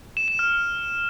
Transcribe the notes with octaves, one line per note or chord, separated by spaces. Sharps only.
E7
E7
F6